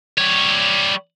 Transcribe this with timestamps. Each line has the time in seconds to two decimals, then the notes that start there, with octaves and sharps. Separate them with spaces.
0.18 G3 C#5